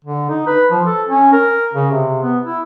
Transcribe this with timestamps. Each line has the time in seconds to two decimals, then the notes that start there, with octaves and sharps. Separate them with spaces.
0.05 D3
0.30 D#4
0.47 B4
0.71 F3
0.86 A4
1.08 C#4
1.33 A#4
1.74 C#3
1.91 C3
2.22 B3
2.44 E4